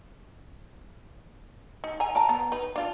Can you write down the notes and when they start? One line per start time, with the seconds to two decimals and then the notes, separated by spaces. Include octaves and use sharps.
1.84 D#4
2.00 G#5 A#5
2.15 A#4 A5 A#5
2.29 B3
2.52 D#4 B4
2.76 D4 F4